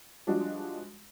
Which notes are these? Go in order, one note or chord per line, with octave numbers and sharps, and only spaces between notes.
F3 G3 G#3 D4 F#4